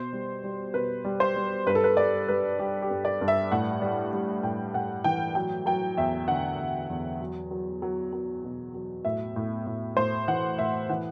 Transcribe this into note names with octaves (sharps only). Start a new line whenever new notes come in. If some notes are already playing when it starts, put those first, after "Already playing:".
Already playing: B2 C5
G3
G3
B2 B4
G3
C5
G3
G2 B4
A4
B4
G3 D5
G3 B4
G3 G4
G4
G2
D5
G2
E5
A2 F#5
G3
G3
A2 G5
A2 F#5
E3 G5
F#3 G5
F#3 G5
E2 E5
D3 F#5
E2
E2
F#3
F#3
F#3
F#3
B2
F#3
A2 E5
A2
A2
A2 C5
E3 F#5
A2 E5
E3 F#5